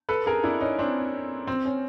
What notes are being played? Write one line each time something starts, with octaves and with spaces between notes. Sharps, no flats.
A4 B4
G#4 A#4
D4 E4
C#4 D#4
C4 D4
C4
C#4